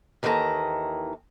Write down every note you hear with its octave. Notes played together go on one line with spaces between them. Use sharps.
D#2 D#3 E3 F#4 A4 A#5